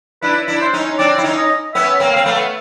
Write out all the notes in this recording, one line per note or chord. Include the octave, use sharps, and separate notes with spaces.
D4 E4 B4
D4 E4
C5
C#4 D#4
C4 D4 D5
E4
C#4 D#4
D#5
B3 C#4 E5
A#3 C4
C4 F5
A3 B3